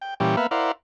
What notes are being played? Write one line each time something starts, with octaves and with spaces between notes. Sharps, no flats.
G5
A#2 E3 G3 C#4 G4
A#3 B3 B4 E5 F5
E4 A#4 C5 D5 F5 F#5